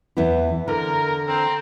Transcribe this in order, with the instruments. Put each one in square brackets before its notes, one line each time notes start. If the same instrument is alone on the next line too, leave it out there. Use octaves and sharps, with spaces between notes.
[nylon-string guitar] E2 B3 E4
[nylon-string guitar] D3 [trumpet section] A#4
[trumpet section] C4 A#5